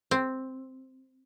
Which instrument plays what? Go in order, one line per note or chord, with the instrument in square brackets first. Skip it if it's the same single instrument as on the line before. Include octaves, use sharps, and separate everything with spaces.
[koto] C4